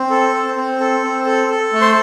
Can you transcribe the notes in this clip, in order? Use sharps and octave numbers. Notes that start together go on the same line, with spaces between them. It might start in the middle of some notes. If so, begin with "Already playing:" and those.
Already playing: C4
A4
C4
C4
A4
C4
A4
A4
A3
C5 C6